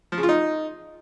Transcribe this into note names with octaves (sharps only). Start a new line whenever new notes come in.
F3
C#3
F4
D#4